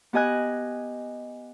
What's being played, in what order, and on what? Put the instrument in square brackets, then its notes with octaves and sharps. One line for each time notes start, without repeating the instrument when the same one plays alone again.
[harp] B3 G4 D#5 G#5 F#6